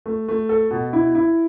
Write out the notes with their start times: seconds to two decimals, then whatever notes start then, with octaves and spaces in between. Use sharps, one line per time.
0.06 A3
0.28 A3
0.49 A4
0.71 B2
0.93 E4
1.15 E4